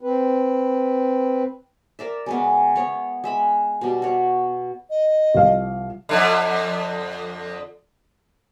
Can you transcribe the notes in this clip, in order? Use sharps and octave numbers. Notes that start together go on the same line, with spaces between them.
C4 B4
A#4 D5 E5
C#3 G#3 B3
B3 C#5
G#3 E5 B5
B2 G3
F#4 C#5
D#5
C2 F3 F5
F2 G#2 D3